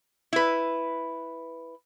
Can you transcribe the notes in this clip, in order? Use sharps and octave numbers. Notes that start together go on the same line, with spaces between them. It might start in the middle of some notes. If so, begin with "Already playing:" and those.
E4 B4